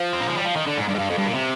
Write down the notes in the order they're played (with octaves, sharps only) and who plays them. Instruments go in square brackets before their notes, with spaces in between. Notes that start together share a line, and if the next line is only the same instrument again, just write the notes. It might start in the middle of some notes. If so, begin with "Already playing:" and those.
Already playing: [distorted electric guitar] F3
C4
A#3
G#3
G3
F3
D#3
D3
G#2
G2
G#2
G2
F2
G2
A#2
C3